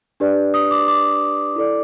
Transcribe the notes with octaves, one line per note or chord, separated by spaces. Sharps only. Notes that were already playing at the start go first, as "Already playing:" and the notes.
D4 G4 B4 D5
D#6
D6
D6
E4 A4 D5